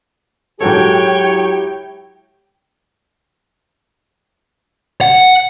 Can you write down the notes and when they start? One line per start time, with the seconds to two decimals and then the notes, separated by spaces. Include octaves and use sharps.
0.61 G#2 F#3 E4 F#4 G4 A4 C#5 G5
5.01 F#5